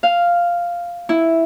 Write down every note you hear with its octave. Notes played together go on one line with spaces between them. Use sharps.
F5
E4